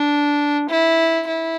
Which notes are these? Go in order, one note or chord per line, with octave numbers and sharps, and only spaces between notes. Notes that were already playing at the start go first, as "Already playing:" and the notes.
Already playing: D4
E4
E4